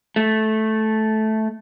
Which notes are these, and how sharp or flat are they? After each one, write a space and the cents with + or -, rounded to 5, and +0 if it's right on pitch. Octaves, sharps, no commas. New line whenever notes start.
A3 -10